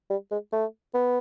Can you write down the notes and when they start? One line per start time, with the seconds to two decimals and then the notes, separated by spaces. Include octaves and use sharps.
0.10 G3
0.31 G#3
0.52 A3
0.94 B3